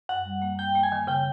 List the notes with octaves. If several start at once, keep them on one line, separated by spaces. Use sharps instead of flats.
F#2 F#5
G3
A#3
A#3 G5
A#3
G#5
D#3
C#3 G5